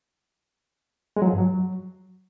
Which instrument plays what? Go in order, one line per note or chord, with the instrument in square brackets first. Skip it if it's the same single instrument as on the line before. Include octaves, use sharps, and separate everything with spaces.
[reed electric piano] G#3
F#3
F3
G2
F#3